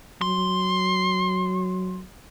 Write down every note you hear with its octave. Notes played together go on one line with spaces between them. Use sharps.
F#3 C6